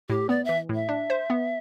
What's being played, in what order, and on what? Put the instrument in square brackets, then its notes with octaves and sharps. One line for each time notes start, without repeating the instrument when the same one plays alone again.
[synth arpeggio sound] A2 [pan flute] G4
[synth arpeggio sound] B3 [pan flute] D5
[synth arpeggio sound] E3 [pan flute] E5
[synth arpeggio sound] A2
[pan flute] E5
[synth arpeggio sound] D4
C5
B3